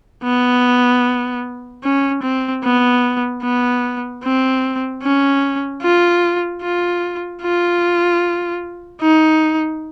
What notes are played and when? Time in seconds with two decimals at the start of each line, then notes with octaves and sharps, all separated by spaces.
0.24 B3
1.83 C#4
2.23 C4
2.63 B3
3.43 B3
4.23 C4
5.03 C#4
5.82 F4
6.62 F4
7.42 F4
9.02 D#4